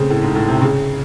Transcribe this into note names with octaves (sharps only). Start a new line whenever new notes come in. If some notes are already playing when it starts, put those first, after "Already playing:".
Already playing: C#3 A3 C4
A2
G#2
A2
C3
C#3